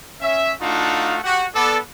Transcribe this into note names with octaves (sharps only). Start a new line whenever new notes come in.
C#4 E5
A3 D4 D#4 F4 F#4 F5
F#4 G4 F#5
B3 A4 D5